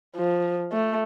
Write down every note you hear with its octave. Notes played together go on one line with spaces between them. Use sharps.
F3
A3